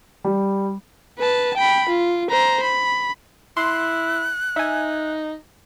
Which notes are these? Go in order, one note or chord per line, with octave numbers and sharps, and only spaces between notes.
G3
B4 A5
G5 B5
F4
C5 A#5
B5
E4 C6 F#6
D#4 E5 G#5